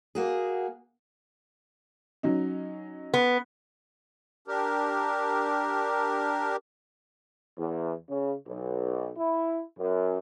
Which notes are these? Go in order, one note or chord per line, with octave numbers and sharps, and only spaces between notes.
A#3 F#4 G#4
F#3 C#4 D#4
B3
D4 G4 A#4
E2
C#3
B1
E4
F#2